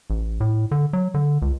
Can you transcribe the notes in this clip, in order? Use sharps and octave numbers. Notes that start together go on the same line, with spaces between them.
A1
A2
D3
F#3
D3
C#2